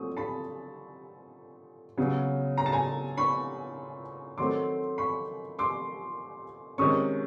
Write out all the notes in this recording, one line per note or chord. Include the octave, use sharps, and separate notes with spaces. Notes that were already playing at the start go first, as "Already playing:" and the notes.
Already playing: A#2 F#3 A3 C4 C#6 D#6
A5 B5
C#3 F#3 B3
A#5
A5
G#5 A#5
B5 C#6
D#3 F#3 A3 C4 C6 D6
B5 C#6
C6 D6
C3 D#3 G#3 C#4 C#6 D#6